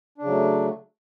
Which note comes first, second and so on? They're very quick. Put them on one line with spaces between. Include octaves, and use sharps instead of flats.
D4 C#3 F#3 A3